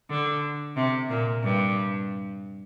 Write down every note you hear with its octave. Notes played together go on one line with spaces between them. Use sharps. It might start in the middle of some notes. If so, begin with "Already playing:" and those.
D3
C3
A#2
G2